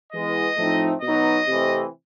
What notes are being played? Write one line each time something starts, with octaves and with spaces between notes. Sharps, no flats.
E3 G#3 B3 D#5
A2 F3 A3 C4 D#4
B2 F#3 B3 D#4 D#5
C3 E3 A3 C4